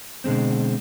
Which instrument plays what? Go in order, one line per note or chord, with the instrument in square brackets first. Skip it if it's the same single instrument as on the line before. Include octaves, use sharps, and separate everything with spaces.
[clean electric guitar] B2 D3 G#3 C4